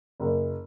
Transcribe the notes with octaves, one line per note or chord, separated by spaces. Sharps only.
F#1